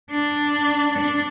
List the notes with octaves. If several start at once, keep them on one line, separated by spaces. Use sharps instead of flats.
D4
D4